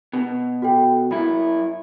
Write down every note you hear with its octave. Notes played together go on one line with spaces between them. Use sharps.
B2
F#4 A4 G5
F#2 E4 B5